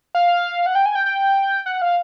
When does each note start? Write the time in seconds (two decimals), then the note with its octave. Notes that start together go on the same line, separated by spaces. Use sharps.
0.15 F5
0.66 F#5
0.75 G5
0.86 G#5
0.95 G5
1.06 G5
1.66 F#5
1.82 F5